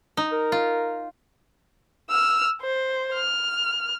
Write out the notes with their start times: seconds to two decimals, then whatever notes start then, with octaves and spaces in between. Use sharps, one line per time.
0.17 D#4
0.32 A#4
0.52 F4
2.10 E6 F6
2.62 C5
3.14 F6